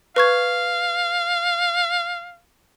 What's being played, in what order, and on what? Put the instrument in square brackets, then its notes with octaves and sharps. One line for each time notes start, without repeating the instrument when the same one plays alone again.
[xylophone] B4 C#6 G#6 [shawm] F5